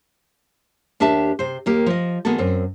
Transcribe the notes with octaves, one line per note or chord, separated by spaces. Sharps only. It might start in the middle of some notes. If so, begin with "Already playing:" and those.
D#2 D4 G4 E5 A5
C3 C5
D#2 A#3 G4
F3 D#5
D#3 G#3 A#3 B3 F#4 A4
F#2 C4